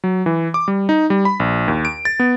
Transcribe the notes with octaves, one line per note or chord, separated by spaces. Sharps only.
F#3
E3
D6
G3
D#4
G3
B5
A#1
D#2
D7
A6
B3